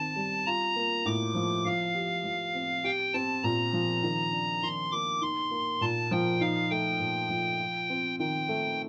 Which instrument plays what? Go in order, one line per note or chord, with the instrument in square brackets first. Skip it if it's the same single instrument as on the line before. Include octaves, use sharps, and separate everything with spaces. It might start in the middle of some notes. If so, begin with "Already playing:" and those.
Already playing: [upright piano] D#3 C4 [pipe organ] A5
[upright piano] G3
[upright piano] F4 [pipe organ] A#5
[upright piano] A#3
[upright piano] A2 [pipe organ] D6
[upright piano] F3
[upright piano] F3 [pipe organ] F5
[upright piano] G4
F3
C4
[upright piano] G4 [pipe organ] G5
[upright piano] C4 [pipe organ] A5
[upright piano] A#2 [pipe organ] A#5
[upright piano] F3
D#3
D4
[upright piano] D#3 [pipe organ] C6
[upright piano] A#3 [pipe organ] D6
[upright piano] D#4 [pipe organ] C6
[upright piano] A#3
[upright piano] A#2 [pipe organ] A5
[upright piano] F3 [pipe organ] G5
[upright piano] D#4 [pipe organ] F5
[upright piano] A3 [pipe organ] G5
[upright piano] A#2
F3
F4
C4
[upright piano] D#3 [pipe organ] G5
[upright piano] A3